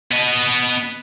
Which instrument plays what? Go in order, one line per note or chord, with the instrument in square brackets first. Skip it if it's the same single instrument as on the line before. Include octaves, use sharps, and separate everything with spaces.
[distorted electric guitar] B3 D#5